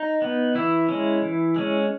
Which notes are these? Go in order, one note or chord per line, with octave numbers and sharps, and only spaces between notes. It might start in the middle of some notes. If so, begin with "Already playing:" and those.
Already playing: D#4
B3
E3 E4
G#3 C#4
E3
G#3 C#4